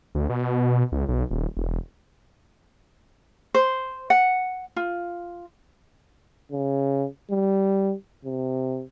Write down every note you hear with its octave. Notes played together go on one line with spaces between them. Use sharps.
D2
B2
C#2
B1
D#1
E1
C5
F#5
F4
C#3
G3
C3